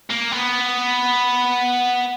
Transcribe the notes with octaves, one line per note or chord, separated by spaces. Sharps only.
A#3
B3